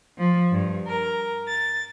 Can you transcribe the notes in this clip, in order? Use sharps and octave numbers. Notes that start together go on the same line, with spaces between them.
F3
G2
A#4
A6